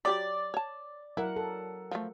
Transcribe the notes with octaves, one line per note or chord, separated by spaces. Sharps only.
F#3 G4 D5 B5
C#5 A5
F#3 E4 A#4 F#5
A4
F3 A3